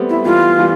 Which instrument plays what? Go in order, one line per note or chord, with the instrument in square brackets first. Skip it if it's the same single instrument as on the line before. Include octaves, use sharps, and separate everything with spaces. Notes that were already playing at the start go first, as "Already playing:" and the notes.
Already playing: [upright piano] G3 A3 B3 C4
[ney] E4
[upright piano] E3 G3 [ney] F4
[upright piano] E3 G3